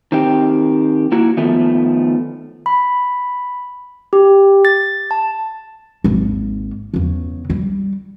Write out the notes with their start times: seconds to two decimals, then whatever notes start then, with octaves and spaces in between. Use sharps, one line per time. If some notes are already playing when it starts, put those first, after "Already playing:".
0.12 D#3 C4 G4
1.12 A#3 E4 F#4
1.37 D#3 F3 A3 B3
2.66 B5
4.13 G4
4.65 A6
5.11 A5
6.04 G#1 D#2
6.94 E2 C#3
7.50 G3